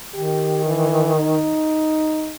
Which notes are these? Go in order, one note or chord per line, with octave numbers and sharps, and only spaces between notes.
D#3 G4
E3
D#4